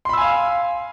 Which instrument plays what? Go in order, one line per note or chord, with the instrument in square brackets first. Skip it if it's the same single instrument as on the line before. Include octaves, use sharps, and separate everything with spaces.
[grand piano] C6
B5
E6
G#5
F5